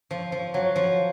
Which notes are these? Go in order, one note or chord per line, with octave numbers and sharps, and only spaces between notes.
F3
F3
F#3
F3